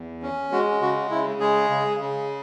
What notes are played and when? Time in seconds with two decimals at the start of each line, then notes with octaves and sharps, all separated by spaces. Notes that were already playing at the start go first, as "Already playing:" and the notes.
Already playing: E2
0.22 C#4
0.52 G#3 F#4
0.81 C#3 F#4
1.11 C#3 E4
1.40 G#3 G#4
1.70 C#3
2.00 C#3